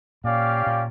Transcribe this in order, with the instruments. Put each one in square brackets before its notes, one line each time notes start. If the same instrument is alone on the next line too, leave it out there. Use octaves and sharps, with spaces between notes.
[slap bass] A#2 [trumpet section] C#4 G4 D5 F5
[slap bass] A#2